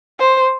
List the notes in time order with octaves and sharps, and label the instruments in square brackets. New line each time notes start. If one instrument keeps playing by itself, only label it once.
[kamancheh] C5